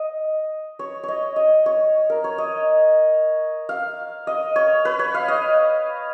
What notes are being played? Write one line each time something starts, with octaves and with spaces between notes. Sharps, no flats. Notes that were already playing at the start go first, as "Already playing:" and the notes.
Already playing: D#5
C#5
C#5 D#5
D#5
C#5
A#4
C#5
D#5
F5
D#5
C#5
B4
C#5
F5
D#5